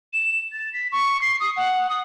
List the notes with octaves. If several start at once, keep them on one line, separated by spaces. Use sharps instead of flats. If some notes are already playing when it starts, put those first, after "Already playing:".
E7
A6
B6
C#6
C7
D#6
F#5
D#6